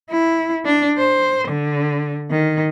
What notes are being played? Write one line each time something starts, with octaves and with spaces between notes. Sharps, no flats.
E4
D4
C5
D3
D#3